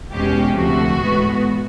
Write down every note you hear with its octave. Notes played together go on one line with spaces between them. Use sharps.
E2 B2 G#3 C#4 G4
D2 C3 F3 A3 F#4
A2 E3 G#3 B3